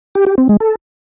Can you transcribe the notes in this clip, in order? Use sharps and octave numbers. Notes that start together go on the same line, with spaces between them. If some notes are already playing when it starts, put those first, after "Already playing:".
G4
G4
C4
G#3
A4